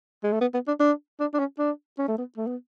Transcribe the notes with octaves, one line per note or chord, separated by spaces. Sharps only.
G#3
A3
B3
B3
D4
D4
D4
D4
C#4
D4
C#4
A3
B3
A3
B3